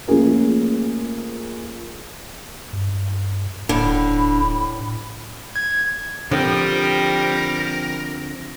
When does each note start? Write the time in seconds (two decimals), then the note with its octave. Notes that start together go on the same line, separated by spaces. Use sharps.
0.08 F3 A3 A#3 C#4 G#4 A#4
2.73 G2
3.69 D#1 A2 D3 B5
5.56 G#6
6.31 D3 F3 G3 C4 G4 A#4